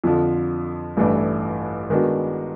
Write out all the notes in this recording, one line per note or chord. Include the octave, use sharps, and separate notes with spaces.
F2 D3 F3
A1 G2 E3 A3 D4
D#3 G#3 B3 D4 F#4